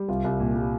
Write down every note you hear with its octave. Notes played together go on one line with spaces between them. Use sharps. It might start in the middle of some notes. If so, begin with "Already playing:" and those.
Already playing: G3
C2 F4
C2
A#2
G3